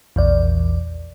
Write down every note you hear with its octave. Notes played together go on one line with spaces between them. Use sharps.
A#1 E2 D5